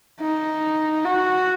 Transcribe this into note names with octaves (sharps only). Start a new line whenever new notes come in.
D#4
F#4